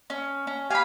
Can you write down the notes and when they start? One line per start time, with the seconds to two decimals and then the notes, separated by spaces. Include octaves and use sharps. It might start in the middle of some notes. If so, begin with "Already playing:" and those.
0.10 C#4
0.47 C#4
0.70 G4 F5 G#5 B5 F6